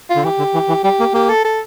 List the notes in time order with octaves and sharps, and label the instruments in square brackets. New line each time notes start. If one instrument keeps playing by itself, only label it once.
[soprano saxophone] F4
[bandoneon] D3
[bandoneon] E3 [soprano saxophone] G4
[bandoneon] D3
E3
E3
[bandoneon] G3 [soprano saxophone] G4
[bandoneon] A#3
[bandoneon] A#3 [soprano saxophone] G4
[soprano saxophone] A4
A4